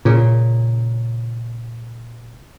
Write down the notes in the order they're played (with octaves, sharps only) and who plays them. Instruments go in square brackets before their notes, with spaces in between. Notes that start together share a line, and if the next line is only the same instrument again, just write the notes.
[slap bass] A#2 C#3